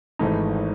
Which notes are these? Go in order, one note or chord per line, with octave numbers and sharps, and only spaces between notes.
G#1 G#2 E3 A3 D#4